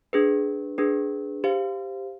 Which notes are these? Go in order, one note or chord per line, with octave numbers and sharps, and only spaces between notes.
D4 G#4 B4
D4 G#4 B4
G4 C5 F5